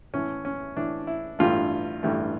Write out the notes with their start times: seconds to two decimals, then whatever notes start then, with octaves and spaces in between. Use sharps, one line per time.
0.13 A2 E3 A3 C#4
0.45 C#4
0.77 A2 E3 A3 D4
1.07 E4
1.39 A1 G2 E3 A3 F4
2.03 A1 G2 E3 A3